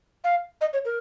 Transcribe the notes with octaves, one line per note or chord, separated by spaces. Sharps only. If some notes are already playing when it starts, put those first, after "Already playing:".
F5
D#5
C#5
A#4